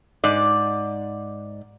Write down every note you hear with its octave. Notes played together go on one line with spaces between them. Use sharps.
G#2 D5